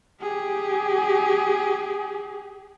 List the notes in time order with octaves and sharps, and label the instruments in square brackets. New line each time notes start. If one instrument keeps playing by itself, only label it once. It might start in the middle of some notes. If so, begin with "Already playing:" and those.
[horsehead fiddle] G4 G#4